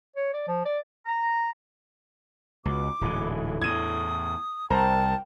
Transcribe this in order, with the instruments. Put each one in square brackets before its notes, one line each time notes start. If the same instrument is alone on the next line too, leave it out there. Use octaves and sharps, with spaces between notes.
[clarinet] C#5
D5
F3
D5
[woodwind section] A#5
[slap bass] C#2 [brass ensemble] B2 [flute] D6
[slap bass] D1 G#2 E3 [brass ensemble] D4 E4 A4
[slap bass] E2 A2 [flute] D#6 [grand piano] G#6 D#7
[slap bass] C2 [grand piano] A#4 C5 A#5 [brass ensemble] G5 [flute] A5